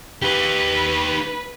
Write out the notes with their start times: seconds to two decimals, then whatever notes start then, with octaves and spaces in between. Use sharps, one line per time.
0.22 D#4 G4 B4